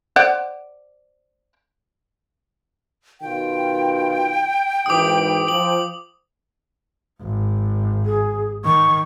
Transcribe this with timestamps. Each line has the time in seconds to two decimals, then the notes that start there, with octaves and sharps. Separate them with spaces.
0.16 C5 D5 F#5
3.21 B2 D#3 F4 G5
4.86 G#1 G#2 E3 D6 D#6
5.48 F3 F#7
7.22 G#1
8.06 G#4
8.65 D#3 C#6